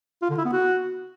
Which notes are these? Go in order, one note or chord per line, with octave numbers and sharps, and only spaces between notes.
F4
D3
E4
B3
F#4